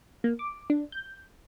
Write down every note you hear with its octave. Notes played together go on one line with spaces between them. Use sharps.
A#3
D6
D4
G6